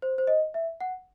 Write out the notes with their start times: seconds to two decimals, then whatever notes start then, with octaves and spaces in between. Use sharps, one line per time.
0.02 C5
0.18 C5
0.27 D#5
0.54 E5
0.81 F#5